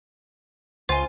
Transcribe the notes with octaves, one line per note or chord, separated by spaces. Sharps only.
C#2 F4 C5 G#5